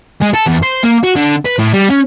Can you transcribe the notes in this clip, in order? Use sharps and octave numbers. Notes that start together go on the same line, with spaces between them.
G#3
A4
E2
C5
A#3
F#4
D3
B4
A2
G3
C#4